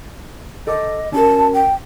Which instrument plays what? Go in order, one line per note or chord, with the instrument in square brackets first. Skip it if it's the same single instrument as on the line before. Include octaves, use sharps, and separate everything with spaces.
[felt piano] A4 D6 [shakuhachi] D#5
[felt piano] C#4 F#4 A#4 [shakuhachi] A5
[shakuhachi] G5